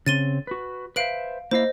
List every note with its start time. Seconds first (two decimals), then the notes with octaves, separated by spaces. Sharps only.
0.06 C#3 C4 A6 D#7 G7
0.47 F#4 B4
0.96 B4 C5 E5 F5 D7 F#7
1.51 A#3 E4 C5 D#5 F5